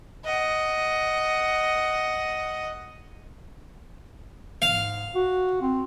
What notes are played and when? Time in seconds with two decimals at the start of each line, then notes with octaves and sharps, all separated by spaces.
0.25 D#5 F#5
4.62 G#2 F5
5.15 F#4
5.62 C4